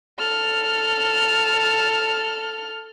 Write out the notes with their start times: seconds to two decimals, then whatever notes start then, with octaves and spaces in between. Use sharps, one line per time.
0.19 A4 F6